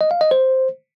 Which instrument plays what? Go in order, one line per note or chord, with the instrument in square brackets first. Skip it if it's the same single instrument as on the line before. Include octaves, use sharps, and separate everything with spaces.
[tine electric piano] D#5
F5
D#5
C5